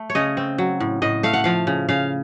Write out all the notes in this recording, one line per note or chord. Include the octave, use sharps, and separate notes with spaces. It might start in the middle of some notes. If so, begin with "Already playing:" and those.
Already playing: A3
C#5
C#3 D#5
C4
F#3
A2
A2 D#5
A3 F5
F#5
F3 F5
C#3
C#3 F5